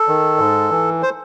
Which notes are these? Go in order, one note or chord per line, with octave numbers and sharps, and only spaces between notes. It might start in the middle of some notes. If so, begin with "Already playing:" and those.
Already playing: A4
D#3
G#2
E3
C5